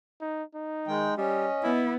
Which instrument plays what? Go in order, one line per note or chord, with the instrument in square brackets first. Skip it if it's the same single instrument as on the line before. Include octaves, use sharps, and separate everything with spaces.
[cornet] D#4
D#4
[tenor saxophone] D#3 [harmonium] G#3 G5
[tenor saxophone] G3 [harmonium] C#4 [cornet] D#5
[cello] B3 [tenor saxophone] E4